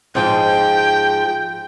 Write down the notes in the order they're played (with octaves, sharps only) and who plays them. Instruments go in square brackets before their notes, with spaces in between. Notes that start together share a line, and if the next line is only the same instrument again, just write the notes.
[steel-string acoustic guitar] G#2 F3 G#3 [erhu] G5